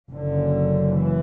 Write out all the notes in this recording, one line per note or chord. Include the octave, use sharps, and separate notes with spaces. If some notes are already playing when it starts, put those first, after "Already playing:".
F#1 F#2 D3
E3